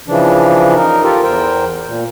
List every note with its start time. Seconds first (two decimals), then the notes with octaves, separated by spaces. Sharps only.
0.08 C#3 E3 F3 D4
0.75 D#4 A#4
1.03 F4 G4 A4 A#4
1.23 E2 A#4 C5 G5
1.86 A#2